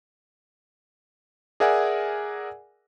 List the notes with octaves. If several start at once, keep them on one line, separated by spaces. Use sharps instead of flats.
G#4 A#4 D5 E5 F#5 G#5